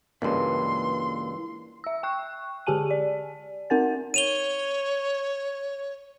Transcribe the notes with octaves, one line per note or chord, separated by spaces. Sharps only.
C#2 G2 E3 G#3 A#3 C6
E5 E6
G5 C#6 F#6
D3 G4 G#4 G#5 A5 D#7
D5
C4 D#4 A#4 F#5 G#5 A6
C#5 D#7 F7 G7